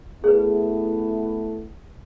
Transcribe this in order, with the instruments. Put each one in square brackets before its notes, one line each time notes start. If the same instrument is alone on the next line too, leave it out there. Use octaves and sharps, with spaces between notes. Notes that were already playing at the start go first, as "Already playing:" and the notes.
[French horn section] A3 B3 E4 [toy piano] G#4 B4